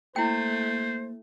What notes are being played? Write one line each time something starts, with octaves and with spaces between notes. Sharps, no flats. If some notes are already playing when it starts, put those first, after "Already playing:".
A3 A#3 E4 C5 G5